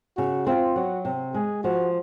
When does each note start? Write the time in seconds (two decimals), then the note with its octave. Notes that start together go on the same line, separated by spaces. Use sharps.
0.17 C#3 F#4
0.47 C4 F4
0.76 F#3 F#4
1.05 C3
1.34 G#3 G#4
1.64 F3 F#4